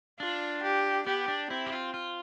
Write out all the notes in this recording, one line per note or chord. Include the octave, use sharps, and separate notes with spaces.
D4 F4
G4
B3 G4
D4
C4 E4
G4
F4
F4